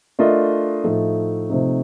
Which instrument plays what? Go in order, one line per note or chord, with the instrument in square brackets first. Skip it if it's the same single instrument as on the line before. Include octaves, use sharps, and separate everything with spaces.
[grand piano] A3 D4 F4 A#4 D#5
A2 F3 A3 D#4 A4
C3 F3 A3 C4 D#4